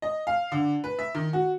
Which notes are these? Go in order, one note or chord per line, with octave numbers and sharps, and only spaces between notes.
D#5
F5
D3
B4
E5
D#3
F#4